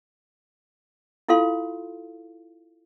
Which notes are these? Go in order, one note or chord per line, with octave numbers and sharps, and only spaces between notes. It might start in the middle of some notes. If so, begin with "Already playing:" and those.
E4 F4 A4 F5 C6